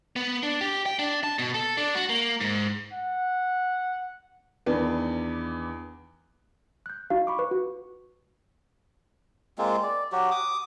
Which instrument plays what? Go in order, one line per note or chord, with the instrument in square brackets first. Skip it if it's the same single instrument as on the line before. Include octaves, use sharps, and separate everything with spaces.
[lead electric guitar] B3
D4
G4
G5
D4
A5
B2
A4
D4
F#4
A#3
G#2
[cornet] F#5
[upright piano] E2 D#3 B3 D4
[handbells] F#6 G6
D#4 F#4 F5
B5 C#6 D6
B4 C#6
F#4
[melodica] G#3 A#3 C4 F4
D5
F#3 F#4 G4
D6 D#6